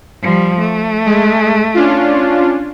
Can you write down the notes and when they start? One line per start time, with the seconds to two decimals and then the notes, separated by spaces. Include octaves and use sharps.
0.22 F3 G3
0.59 A3
1.06 G#3
1.74 C#4 D4 F4